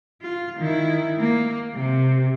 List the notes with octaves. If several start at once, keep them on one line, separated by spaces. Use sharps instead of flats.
F4
D#3 E4
A#3
C3